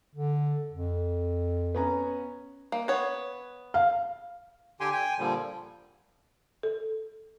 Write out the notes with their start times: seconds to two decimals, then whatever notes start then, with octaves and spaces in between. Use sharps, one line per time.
0.15 D3
0.71 F2
1.75 B3 C#4 A#5
2.72 A#3
2.88 B3 C#5
3.74 F5
4.80 D3 G4 G5 G#5 C6
4.92 G5 G#5
5.19 A#2 D3 F3 G3
6.63 A4